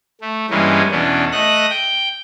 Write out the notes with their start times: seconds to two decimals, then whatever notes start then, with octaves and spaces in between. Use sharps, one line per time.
0.21 A3
0.50 G2 E3 G#3 A#3 C#4
0.91 E2 B2 C#4 D4
1.32 A3 D#5 F#6 A#6
1.70 G5